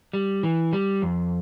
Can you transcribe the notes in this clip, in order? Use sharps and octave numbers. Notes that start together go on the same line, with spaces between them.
G3
E3
G3
F2